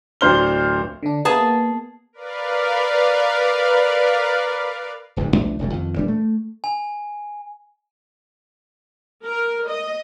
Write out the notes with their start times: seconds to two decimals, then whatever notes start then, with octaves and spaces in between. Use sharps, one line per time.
0.21 D1 F#3 D4 C5 F6 G7
1.03 D3 D4
1.25 A#3 B3 G#4 A5
2.13 A#4 B4 D5 F5
5.16 D1 B1 E2 G#2
5.35 B1 F3 A3 D4
5.59 F1 B1 G#2 A3
5.72 F2 D#3
5.96 D#1 E3 G3 D4
6.08 A3
6.64 G#5
9.24 A#4
9.69 D#5